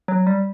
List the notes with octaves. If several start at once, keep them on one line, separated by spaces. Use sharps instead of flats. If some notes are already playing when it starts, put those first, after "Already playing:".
F#3
G3